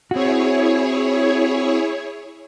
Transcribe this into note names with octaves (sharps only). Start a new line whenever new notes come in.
C4 E4 F#4 G#4 C#5